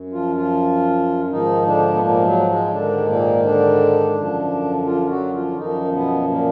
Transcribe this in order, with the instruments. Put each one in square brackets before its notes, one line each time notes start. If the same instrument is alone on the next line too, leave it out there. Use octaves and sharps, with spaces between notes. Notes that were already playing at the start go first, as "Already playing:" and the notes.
Already playing: [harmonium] F#2
F3 F4
F3 F4
G#2 D#3 F3 D#4
D3 D4
B3
A#2 A#3
F#3
G#3
G#2 D3 D#3 D4
A#2 A#3
D3 D4
F#2 D3 F3
F3 F4
F#3 F#4
F3 F4
F#2 D#3 F3 D#4
B2 B3
A#2 A#3